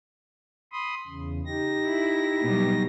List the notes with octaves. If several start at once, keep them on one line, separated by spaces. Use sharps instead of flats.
B5 C6 D#6
E2 C#3
D#4 G4 A#6
E4
B2 F#3 G3